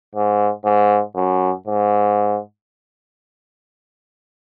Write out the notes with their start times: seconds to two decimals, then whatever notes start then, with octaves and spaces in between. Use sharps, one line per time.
0.15 G#2
0.65 G#2
1.16 F#2
1.67 G#2